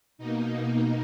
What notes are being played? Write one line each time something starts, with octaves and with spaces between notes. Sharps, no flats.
B2 A#3 D#4